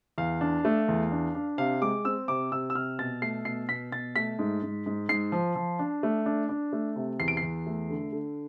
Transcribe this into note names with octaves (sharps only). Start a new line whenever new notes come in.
E2 F5
D4
A3
E2
D4
D4
C3 F5
G#3 D6
C4 E6
C3 D6
C3 E6
E6
C3 F6
B2 A6
A3 C7
B2 C7
B2 B6
B2 A6
A3 B6
G#2
G#2
G#2
G#2 C7
F3
F3
D4
A3
D4
D4
A3
C3
E2 C7
D7
C7
E2
A3
D3
D3